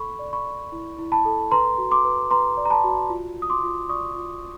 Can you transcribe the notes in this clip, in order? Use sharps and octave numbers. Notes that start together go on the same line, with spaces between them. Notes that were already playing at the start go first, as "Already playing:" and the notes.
Already playing: A4 B5 C#6
D5
B5 C#6
D5
E4
E4
A5 B5
A4
B4 A#5 C6
F#4
C6 D6
B4
B4 A#5 C6
D5
A#5
A5 B5
F#4
F4
F4
D#6
C6 D6
F4
D5 C#6 D#6
F4